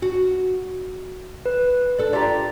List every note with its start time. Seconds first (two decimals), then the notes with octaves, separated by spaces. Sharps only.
0.02 F#4
1.46 B4
1.98 D4 A4
2.13 F4 G4 D5 A#5